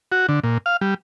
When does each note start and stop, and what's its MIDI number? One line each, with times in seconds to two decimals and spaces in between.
0.12 0.26 66
0.29 0.40 50
0.44 0.58 46
0.66 0.77 77
0.81 0.94 55